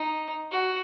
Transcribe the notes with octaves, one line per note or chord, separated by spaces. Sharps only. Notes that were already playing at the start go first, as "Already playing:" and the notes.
Already playing: D#4
F#4